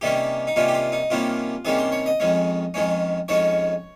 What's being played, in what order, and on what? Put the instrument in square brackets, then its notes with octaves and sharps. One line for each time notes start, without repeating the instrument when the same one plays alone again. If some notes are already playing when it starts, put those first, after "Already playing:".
[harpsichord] C3 D#3 G3 A#3 C#4 G4
D#4
C3 D#3 G3 A#3 C#4 F4
G4
F4
D#4
C3 D#3 G3 A#3 C#4 F4
C3 D#3 G3 A#3 C#4 G#4
C5
C#5
D#5
F2 D#3 G#3 C#4
F2 D#3 G#3 C#4
F2 D#3 G#3 C#4 C#5